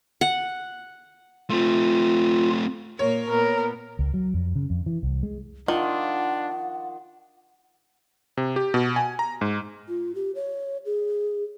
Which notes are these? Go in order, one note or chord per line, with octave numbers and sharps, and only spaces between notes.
F#5
A3 C4 F4
A#2 A#3 A#4 C#5
A#2 B3 A#4
C#2
F#3
F2
C#3
F2
E3
C2
G#3
D#3 D4 F4 F#5
C3
G4
B2
G#5
A#5
G#2
F4
G4
C#5
G#4